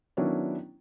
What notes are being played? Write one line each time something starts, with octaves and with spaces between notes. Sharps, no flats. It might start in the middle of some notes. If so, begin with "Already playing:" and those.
D#3 F#3 B3 C#4 D4 E4